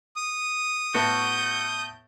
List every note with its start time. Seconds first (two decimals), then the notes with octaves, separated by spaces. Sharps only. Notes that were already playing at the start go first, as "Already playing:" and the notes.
0.16 D#6
0.94 A2 B3 F#4 A4 G6